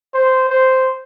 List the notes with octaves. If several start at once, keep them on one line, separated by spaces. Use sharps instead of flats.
C5
C5